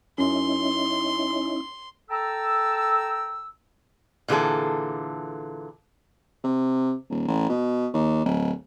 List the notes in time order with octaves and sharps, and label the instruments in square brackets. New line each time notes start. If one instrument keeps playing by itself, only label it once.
[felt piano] F#2 [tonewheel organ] C#4 D#4 E4 [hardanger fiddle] C6
[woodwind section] A4 G5 A5 A#5 E6
[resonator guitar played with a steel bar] A#2 D3 E3 G#4 A4
[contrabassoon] C3
D#1
A1
B2
D#2
D1